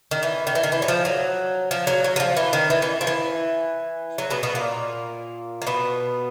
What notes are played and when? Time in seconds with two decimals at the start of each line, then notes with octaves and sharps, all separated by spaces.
0.11 D#3
0.23 E3
0.47 D#3
0.55 E3
0.63 D#3
0.72 E3
0.82 F#3
0.88 F3
1.05 F#3
1.71 F3
1.87 F#3
2.04 F#3
2.16 F#3
2.20 F3
2.37 E3
2.53 D#3
2.70 E3
2.82 E3
3.01 F3
3.07 E3
4.18 F#3
4.30 B2 B3
4.43 B2 B3
4.55 A#2 A#3
5.62 A#3
5.67 B2 B3